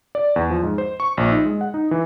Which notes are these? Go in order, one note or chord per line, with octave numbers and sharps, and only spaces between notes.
D5
E2
F3
G#2
C5
C#6
A#1
D#4
G#3
F#5
D#4
E3